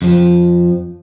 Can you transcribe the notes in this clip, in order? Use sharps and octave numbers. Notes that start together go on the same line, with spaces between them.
F2 F3